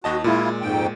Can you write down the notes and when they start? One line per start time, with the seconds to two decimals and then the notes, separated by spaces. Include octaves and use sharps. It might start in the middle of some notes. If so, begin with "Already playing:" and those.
0.04 D#2 F#4 D#5 A5
0.24 A#2 G#3 E4 F4
0.62 F2 G#2 G5